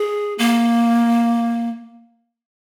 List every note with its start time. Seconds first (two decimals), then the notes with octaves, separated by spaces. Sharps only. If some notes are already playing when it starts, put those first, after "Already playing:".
Already playing: G#4
0.38 A#3